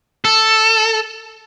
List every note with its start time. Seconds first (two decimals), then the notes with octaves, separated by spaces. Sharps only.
0.25 A4